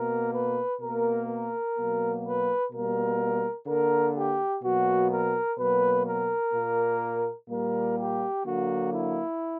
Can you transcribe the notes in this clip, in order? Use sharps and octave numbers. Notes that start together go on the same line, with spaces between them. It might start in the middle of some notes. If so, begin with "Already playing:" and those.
Already playing: B2 A#3 A#4
B4
B2 A#3 A#4
A#4
B2 F#3 A#3
B4
B2 G3 A#3 A#4
D3 A#3 A#4
G4
B2 F#3 A#3 F#4
A#4
B2 F#3 A#3 B4
A#4
A#2 A#3
A#2 G3 A#3 A#4
G4
D3 F#3 A#3 F#4
E4